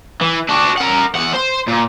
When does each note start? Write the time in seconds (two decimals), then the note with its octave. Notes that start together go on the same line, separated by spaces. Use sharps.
0.21 E3
0.49 D4 F#4
0.78 A#4 F#5
1.15 E2 F#5
1.33 C5
1.68 A#2